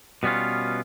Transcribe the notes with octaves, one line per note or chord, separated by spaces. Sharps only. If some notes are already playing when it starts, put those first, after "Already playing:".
B2 G3 B3 C#4 F4